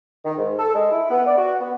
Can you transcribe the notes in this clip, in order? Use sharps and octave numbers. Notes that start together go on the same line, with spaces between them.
D#3
G#2
A4
G#3
E4
B3
D5
F#4
B3